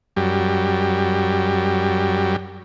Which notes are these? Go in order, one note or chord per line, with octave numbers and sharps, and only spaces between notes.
F#2 G3